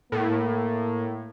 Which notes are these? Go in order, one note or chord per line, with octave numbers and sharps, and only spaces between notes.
A2 A#3